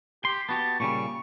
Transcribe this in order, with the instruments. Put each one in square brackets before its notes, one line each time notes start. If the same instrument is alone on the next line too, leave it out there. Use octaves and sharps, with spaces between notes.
[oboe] G4 [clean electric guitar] C6
[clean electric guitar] B3 F#4 G4 [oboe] A5
[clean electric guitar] A#2 C#3 G3 [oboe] C#6